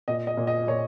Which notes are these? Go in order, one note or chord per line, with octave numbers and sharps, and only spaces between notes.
A#2 D#5
D#5
A#2
D#5
A#2 C#5